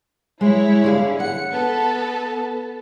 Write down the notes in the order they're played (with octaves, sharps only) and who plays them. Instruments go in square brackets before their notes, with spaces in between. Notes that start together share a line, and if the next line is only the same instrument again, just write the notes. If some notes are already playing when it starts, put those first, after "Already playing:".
[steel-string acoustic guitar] G#3 [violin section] E4 C#5
[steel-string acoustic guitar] D3 G#4 F5
[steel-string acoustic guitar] F#5 [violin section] C#7
[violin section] B3 A4 A5